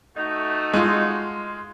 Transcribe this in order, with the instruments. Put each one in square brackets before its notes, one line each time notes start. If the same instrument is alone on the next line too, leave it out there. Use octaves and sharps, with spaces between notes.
[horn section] A3 D#4 F#4
[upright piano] G#3 F4